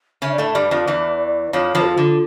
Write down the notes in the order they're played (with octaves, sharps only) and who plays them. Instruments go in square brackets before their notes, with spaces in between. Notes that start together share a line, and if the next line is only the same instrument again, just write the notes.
[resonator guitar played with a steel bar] C#3 C#4 [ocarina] E5
[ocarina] D5
[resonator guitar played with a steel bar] A2 A3 [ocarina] E5
[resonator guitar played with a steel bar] G2 G3 [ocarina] D5
[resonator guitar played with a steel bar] F2 F3
E2 E3
[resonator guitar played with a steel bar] F2 F3 [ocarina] C#5
[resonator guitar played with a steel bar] F2 F3
[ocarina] F4
[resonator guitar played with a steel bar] D3